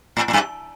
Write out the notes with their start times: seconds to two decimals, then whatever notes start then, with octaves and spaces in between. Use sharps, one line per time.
0.17 A2
0.28 A2
0.33 G2